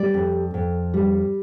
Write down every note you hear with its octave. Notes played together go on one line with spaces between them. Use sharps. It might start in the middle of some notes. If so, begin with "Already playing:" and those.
Already playing: G3 D5
F2
F2
G3